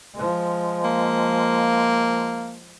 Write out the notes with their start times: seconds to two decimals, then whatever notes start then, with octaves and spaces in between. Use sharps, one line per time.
0.14 F3 G#3
0.84 A#3